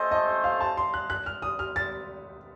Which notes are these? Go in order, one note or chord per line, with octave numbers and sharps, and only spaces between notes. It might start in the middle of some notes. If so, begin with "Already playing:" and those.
Already playing: A3 C#4 A4 C5 D#5
D#5
F5
A5
C6
F#6
F#6
F6
D#6
F6
A6